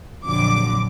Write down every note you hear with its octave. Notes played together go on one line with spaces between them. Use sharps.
A#1 F2 D3 F#3 D6